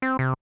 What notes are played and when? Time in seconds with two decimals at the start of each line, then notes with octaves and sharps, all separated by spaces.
0.02 C4
0.19 C3